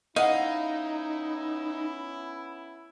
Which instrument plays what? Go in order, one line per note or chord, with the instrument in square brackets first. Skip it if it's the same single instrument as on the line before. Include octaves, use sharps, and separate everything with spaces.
[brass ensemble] B3 C#4 E4 [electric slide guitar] D#4 [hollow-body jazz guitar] D#5 F#5 [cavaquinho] F5